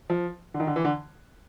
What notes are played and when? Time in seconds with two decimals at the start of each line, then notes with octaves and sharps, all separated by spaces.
0.10 F3
0.54 D3
0.60 D#3
0.67 D3
0.76 E3
0.85 D3